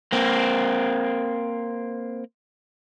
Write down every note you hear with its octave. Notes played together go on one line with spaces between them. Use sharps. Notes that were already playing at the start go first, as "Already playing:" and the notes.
A#3 C4